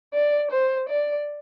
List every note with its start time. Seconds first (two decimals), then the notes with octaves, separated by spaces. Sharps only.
0.14 D5
0.51 C5
0.89 D5